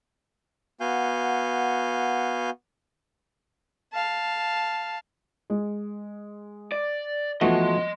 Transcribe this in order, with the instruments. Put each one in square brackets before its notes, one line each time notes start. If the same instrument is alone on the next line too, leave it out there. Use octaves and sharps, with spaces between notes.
[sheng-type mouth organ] B3 F#4 F5 G#5 G6
[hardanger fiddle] F5 A5
[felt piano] G#3
[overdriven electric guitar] D5
[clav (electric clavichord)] E3 A3 F#4 [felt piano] F3 B3 [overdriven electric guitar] D#5 C6